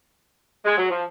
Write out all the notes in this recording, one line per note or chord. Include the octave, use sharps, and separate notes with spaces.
G#3
F#3
F3